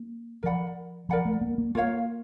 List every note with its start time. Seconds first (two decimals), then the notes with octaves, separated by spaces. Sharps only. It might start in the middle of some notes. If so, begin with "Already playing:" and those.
Already playing: A#3
0.43 F3 A#4 D5 F#5 B5
1.09 F3 A#4 D5 F#5 B5
1.25 A3
1.41 A#3
1.58 A#3
1.75 A#3 F4 A#4 C#5 F5